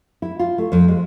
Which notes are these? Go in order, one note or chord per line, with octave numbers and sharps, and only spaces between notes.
E4
F4
A3
F2
G#3